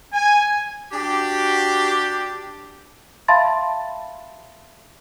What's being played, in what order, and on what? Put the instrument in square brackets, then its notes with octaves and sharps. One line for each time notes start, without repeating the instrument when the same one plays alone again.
[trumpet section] G#5
[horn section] D4 F#4 G4
[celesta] E5 F5 A5 B5 C6 A6